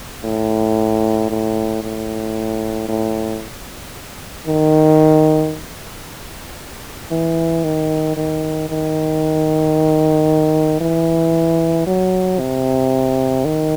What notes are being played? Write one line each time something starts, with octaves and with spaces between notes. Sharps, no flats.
A2
A2
A2
A2
D#3
E3
D#3
D#3
D#3
E3
F#3
C3
D#3